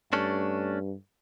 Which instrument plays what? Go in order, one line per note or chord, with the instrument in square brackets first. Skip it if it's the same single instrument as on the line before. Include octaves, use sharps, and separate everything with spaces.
[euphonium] G2 [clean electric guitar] A3 C#4 D4